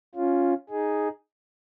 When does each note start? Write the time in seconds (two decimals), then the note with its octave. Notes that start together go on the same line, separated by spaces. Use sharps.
0.15 C#4 F4
0.70 D#4 G#4